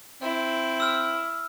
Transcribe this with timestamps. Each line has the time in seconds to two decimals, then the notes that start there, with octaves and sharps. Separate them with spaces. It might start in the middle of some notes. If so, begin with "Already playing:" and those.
0.22 C4 E4
0.80 E6 F6